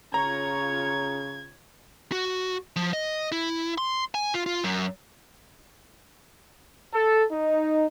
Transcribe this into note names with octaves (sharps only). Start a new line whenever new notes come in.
C#3 F4 C#5 A#5 G#6
F#4
F3
D#5
E4
C6
G#5
F4
F4
F#2
A4
D#4